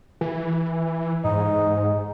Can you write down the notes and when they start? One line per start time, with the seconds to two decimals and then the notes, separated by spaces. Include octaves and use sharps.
0.21 E3
1.24 G#2 D#4